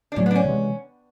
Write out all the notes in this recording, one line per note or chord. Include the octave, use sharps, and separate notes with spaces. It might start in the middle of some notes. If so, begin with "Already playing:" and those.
D4
A2 F#3 A3 C#4
B3
D4
C#4
C3 E3 G#3